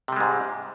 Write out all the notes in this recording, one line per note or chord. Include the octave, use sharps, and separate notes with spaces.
G#2 C3 G3 G#3